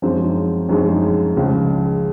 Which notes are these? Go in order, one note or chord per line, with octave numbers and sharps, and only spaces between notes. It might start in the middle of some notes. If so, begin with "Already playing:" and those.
F#2 F3 G#3 C4 D#4
F#2 F3 G#3 C4 D#4
C#2 C#3 F3